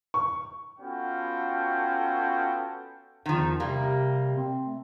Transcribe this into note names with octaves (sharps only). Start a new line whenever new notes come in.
C#6
B3 C#4 F4 F#4 A4 G5
E2 D#3 F3
C3 G3 A#3
C4
A3